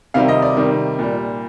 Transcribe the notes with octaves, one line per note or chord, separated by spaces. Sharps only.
C3 D#3 G3 F5
D#5
D5
C3 D#3 G3
A#2 G3